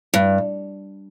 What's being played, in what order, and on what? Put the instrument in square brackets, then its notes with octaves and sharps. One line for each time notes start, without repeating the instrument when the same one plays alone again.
[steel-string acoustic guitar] G2